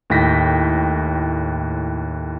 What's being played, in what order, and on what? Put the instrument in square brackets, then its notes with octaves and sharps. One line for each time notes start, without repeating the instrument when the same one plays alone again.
[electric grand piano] D#2 A2 G5 A#6 B6